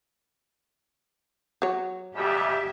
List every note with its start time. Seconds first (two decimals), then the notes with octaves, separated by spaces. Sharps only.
1.62 F#3 C#5
2.15 F2 G#2 G3 G4 E5